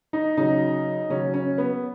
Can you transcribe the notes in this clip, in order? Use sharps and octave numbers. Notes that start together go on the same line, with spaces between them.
D#4
C#3 F#3 D#4
C#3 F#3 C#4
C#4
B3